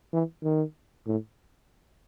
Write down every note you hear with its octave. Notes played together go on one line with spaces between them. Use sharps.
E3
D#3
A2